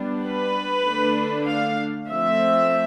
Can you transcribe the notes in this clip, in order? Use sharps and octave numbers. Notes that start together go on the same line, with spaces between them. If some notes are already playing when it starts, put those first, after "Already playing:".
Already playing: G3 B3 D4
B4
D3 A3 D4
F5
F3 A3 C4 E5